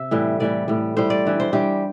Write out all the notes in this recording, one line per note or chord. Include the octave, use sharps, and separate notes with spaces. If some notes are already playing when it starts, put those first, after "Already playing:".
Already playing: C3 E5
A2 E3 G3
A2 E3 G3 D5
A2 G3
A2 G3 C5
D5
G2 E3 G3
C5
G2 E3 G3 G4